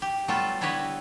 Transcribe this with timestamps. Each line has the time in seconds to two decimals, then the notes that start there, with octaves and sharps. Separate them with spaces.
0.02 G4
0.28 F#3 G3 A3 B3 F4 A4
0.61 D3 E4 G4 B4 C#5 D#5